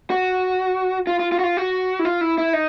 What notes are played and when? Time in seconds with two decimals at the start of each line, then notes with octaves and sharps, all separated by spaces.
0.10 F#4
1.07 F4
1.19 F4
1.32 F4
1.39 F#4
1.44 F4
1.57 F#4
1.99 E4
2.05 F4
2.21 E4
2.38 E4
2.53 D#4